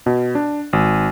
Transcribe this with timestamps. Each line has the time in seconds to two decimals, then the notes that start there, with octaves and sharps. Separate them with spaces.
0.06 B2
0.35 D4
0.73 G#1